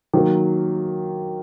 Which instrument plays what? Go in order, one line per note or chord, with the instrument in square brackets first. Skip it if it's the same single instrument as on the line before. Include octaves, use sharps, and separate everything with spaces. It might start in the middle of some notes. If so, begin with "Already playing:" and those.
[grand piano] D#3 F#3 A#3